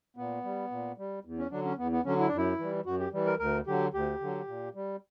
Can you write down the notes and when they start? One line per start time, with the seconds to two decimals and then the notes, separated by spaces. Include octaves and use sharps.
0.17 A#2 B3
0.44 G3
0.71 A#2
0.98 G3
1.25 E2
1.38 C#4
1.51 D3 F#3 D4
1.65 C#4
1.78 E2 B3
1.92 B3
2.05 D3 F#3 C#4
2.19 E4
2.28 D4
2.32 F#2
2.37 E4
2.59 E3 G3
2.86 F#2 F#4
3.00 G4
3.13 E3 G3
3.26 A#4
3.39 D2 A#4
3.67 D3 F#3 G4
3.94 D2 G4
4.20 D3 F#3
4.47 A#2
4.75 G3